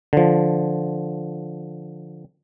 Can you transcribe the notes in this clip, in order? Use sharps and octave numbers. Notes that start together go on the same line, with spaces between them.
D3 F3